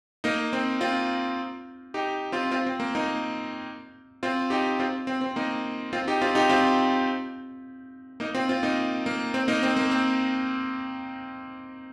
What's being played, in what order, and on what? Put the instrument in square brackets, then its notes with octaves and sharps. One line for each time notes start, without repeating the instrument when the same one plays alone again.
[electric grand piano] A#3 D#4
C4
C4 F4
D#4 G4
C4 F4
C4 F4
C4
A#3
A#3 D#4
C4 F4
D#4 G4
C4 F4
C4
C4
A#3 D#4
C4 F4
D#4 G4
C4 F4
D#4 G4
C4 F4
A#3 D#4
C4 F4
C4 F4
A#3 D#4
A#3
C4
A#3 D#4
C4
A#3
C4